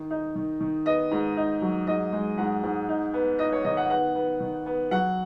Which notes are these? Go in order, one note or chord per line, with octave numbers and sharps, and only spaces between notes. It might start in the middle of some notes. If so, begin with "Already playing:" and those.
Already playing: D#3
D#4
D#3
D#3
B3 D#5
G#2
D#4
F#3
G#2 D#5
G#3
G#2 F#5
G#2
D#4
B3
D#4 D#5
C#5
D#3 D#5
F#5
B3 F#5
B3
D#3
B3
F#3 F#5